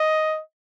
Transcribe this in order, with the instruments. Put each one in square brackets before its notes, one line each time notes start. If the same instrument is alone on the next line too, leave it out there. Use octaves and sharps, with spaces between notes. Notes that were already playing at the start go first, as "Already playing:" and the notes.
Already playing: [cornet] D#5